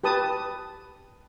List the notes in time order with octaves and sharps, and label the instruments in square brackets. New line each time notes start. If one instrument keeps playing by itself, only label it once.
[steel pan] G4 B4 A5 D#6